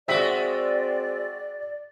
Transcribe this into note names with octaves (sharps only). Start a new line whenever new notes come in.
G#3 C4 F#4 D5 E5 B6 F#7